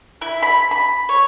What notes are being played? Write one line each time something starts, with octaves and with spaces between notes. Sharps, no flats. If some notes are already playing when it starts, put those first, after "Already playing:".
E4
B5
B5
C#5